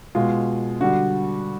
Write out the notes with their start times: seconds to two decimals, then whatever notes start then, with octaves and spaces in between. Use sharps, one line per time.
0.15 B2 G#3 F4
0.80 D3 G3 F#4